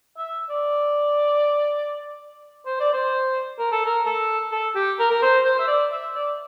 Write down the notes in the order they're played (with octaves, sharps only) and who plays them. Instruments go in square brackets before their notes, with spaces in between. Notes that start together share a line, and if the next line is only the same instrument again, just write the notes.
[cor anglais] E5
D5
C5
D5
C5
A#4
A4
A#4
A4
A4
G4
A#4
A#4
C5
C5
E5
D5
E5
D5